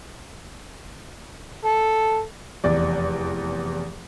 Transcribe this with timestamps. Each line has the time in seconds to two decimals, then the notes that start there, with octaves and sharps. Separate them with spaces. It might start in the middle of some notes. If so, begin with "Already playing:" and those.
1.65 A4
2.64 F1 E2 D5